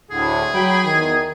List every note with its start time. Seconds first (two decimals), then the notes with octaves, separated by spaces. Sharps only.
0.11 D2 A2 D3 G#4
0.54 F#3 G5 B5
0.85 E2 D#3